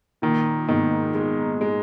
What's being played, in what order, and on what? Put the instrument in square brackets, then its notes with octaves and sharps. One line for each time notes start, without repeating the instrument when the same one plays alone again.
[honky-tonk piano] A#2 [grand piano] D#3
[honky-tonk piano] G#2 B2 [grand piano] D#3
[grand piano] G#3
G#3